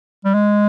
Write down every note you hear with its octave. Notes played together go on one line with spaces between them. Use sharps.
G3
G#3